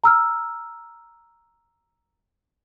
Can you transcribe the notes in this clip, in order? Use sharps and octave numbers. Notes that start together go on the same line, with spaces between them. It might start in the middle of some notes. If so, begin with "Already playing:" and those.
A#5 E6 F6